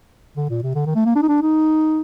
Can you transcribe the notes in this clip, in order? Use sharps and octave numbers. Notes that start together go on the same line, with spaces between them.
D3
A#2
C3
D3
D#3
A3
A#3
D4
D#4
D4
D#4